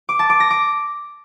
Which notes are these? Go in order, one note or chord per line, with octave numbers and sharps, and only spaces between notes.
D6
A5
D6
A#6
D6